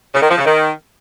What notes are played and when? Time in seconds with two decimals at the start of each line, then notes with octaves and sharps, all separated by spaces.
0.14 C#3
0.22 D#3
0.30 F3
0.38 C#3
0.45 D#3